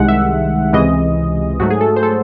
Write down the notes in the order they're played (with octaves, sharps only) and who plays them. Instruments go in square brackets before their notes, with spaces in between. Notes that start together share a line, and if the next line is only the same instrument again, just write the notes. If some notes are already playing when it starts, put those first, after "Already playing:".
Already playing: [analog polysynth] C2 C3 D#3 G#3 F#5
E5
C#2 C3 E3 G#3 D#5
G#2 F#3 A3 F#4
G#4
A4
C5
A4